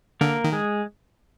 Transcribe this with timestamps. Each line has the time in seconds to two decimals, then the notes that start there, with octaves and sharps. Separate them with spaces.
0.21 D3 A#3 A#4
0.44 D#3
0.52 G#3 G#4